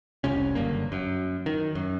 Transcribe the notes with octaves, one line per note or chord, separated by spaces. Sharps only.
F1 C2 C3 C#4
F#1 G2 D3 A#3
F#2
D#3
F#2